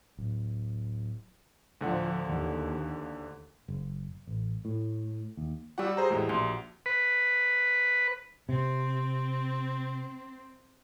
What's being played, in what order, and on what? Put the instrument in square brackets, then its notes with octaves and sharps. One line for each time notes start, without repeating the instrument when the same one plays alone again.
[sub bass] D1
[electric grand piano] D2 D3 F#5 [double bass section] A2 F3
[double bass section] D#2
[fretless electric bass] F#1
A1
A2
D#2
[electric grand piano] G3 F#5 [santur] F#4 G4 E6
[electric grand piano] G#4 C5 A#5
E2 A2 G#3
[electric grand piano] A#1 [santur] C6
[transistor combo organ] B4
[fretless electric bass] C3 [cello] C4